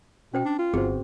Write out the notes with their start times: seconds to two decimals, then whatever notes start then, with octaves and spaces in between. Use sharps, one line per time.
0.34 B2 C#4 C5 G5
0.45 D4
0.59 F4
0.73 G1 B3 C4 F#4 G#4 C5